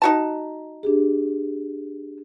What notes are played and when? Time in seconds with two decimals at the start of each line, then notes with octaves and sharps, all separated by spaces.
0.02 D#4 F#4 A5
0.83 D4 G4 G#4